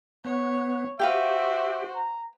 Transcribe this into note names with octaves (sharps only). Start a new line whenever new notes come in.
B3 C#5
F#4 G4 B4 C5 E5 F5 G5
A#5